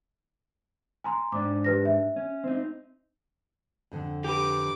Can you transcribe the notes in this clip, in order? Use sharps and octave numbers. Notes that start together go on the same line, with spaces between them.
G#5 A#5 C6
G#2 D4 D6
G4 B4 A#6
E5
C#4
C4 D#4
F2 D3
G4 A#4 B4 D6